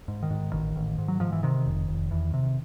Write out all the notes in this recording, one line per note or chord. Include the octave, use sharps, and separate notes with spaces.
G#2
D#3
G#2
A1 D#3
A1
G#2
F#3
G#2 F3
E3
C3 D#3
F1
F1
E2
C3